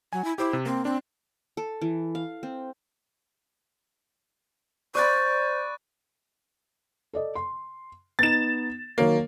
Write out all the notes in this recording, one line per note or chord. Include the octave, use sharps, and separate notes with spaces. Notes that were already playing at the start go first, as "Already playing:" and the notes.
F#3 G#5
E4
E4 G4 C5 D6
C3
A#3 C4
C4 D4
A4
E3
F5
C4
C5 D5 B5 C#6 F#6 A6
A4 D5 D#5
C6
B3 D#4 A6 E7
D#3 F#3 A#3 C#5